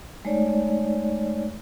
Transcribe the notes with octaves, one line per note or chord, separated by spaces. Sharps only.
G#3 A3 D#4 C#5 D5